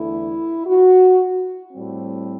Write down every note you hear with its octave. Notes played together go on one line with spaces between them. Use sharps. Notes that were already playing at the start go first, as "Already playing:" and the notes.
Already playing: E2 D3 A3 E4
F#4
A2 G3 C4